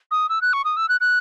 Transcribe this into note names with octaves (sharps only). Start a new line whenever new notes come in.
D#6
E6
F#6
C#6
D#6
E6
F#6
F#6